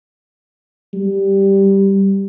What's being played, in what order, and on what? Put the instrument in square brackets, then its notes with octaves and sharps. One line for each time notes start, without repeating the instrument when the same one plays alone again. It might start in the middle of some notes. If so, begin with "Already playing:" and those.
[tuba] G3